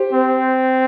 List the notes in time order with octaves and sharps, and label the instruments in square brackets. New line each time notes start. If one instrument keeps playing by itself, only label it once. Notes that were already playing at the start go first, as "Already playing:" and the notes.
Already playing: [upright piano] G4 C5
[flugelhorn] C4